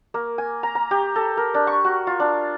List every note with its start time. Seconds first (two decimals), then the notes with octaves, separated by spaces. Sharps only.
0.14 A#3
0.38 G#5
0.63 A#5
0.75 A#5
0.91 G4
1.16 A4
1.37 A#4
1.54 D4
1.67 C#6
1.85 F#4
2.07 F4
2.20 D4